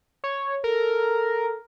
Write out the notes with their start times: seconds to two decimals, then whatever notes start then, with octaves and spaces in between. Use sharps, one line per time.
0.24 C#5
0.64 A4 A#4